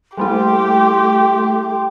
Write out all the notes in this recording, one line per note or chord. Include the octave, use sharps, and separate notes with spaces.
G3 A3 A#3 E4 G4 G5 C6